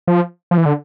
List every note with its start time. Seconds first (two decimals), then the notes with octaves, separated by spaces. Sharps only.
0.07 F3
0.51 F3
0.58 E3
0.66 D3